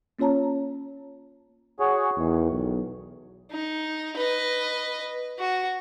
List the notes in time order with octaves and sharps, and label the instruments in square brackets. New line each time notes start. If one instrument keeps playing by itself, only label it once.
[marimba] A#3 C#4 F4 C#5 A5 A#5
[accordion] F#4 G#4 C#5
[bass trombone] E2 [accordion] D#3
[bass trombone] B1
[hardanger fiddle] D#4
B4 D#5
F#4